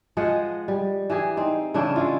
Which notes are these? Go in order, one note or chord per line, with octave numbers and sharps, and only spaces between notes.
F3 G#3 D#5 F#5
G3
E3 G4 G#4
C4 D#4
C#3 E3 D4 E4
G#3 E4 F4